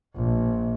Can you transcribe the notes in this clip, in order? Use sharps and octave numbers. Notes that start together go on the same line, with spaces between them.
A#1